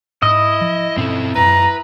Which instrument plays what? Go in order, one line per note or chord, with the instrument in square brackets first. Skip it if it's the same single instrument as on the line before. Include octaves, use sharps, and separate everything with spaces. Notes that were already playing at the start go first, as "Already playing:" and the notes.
[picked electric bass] G#2 [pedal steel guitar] E4 D#6 [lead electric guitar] D#5
[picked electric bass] F3
[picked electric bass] G2 B2 C#4 [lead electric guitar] C4 A4
[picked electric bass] D#1 F#2 [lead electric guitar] B4 [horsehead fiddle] A#5